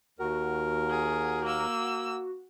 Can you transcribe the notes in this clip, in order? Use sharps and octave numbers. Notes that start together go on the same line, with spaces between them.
D#2 F#4 A#4
G#4
A#3 E6